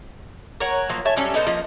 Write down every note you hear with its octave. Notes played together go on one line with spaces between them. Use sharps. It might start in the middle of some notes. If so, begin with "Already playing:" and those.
A#4 C#5 F#5 G#5
F3 F#3 A#3
A4 C#5 E5 G#5
F#3 G3 C#4 A4
B3 D#4 A4 C5
F3 A#3 D#4